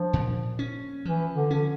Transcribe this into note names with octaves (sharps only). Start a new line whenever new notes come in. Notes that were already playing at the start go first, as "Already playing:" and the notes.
Already playing: F3 D4
A#2
C#4
E3 F3
D3
D3 C#4